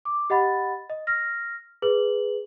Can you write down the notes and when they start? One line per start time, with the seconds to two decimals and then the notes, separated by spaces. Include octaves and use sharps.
0.05 D6
0.30 G4 D#5 F#5 B5 A6
0.90 D#5
1.07 F6 A#6
1.82 G#4 B4 F#7